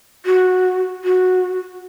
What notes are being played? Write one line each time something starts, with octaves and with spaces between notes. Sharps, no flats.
F#4
F#4